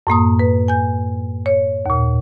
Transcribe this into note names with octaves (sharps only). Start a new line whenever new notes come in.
F#2 A2 A#3 D#6
B4
G#5 G6
C#5
D#2 A#2